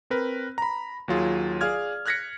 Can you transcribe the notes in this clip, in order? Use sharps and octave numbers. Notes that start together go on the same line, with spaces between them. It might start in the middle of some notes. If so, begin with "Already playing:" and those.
C4 A#4 B4
A#5 B5
D#2 F#3 F4 G#4
G#4 D5 F5 F6 G#6
F6 F#6 G#6 A#6 B6 C#7